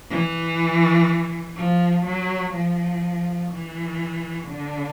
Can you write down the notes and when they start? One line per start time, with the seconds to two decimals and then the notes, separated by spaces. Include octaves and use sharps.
0.10 E3
1.57 F3
2.06 F#3
2.54 F3
3.51 E3
4.49 D3